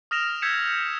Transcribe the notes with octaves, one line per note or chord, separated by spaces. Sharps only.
D#6 F6 A#6 E7 F7
E6 G6 G#6 B6 C#7 E7